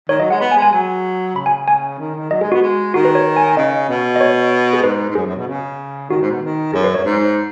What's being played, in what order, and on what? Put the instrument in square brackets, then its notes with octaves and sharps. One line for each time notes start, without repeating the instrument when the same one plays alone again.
[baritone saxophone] D#3 [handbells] C#5
[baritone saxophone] F#3 [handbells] D#5
[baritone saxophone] G#3 [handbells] F#5
[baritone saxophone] B3 [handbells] B5
[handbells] G#5
[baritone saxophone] G#3
[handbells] G#5
[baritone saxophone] F#3 [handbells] G#5
[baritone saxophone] C#3 [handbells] B5
[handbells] G#5
G#5
[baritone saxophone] D#3
D#3
[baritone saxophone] F#3 [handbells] D#5
[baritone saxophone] G#3 [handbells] G#4
[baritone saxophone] B3 [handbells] F#4
[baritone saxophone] G#3
[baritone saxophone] D#3 [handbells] F#4
[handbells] B4
C#5
G#5
G#5
[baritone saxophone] C#3 [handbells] D#5
[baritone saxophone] B2
[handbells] D#5
C#5
G#4
[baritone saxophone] G#2 [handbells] B4
[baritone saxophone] G#2
[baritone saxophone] F#2 [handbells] G#4
[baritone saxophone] F#2
B2
C#3
[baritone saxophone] D#3 [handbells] F#4
[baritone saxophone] G#2
B2
D#3
[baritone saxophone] F#2 [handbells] G#4
[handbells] B4
[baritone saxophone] F#2 [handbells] C#5
[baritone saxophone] G#2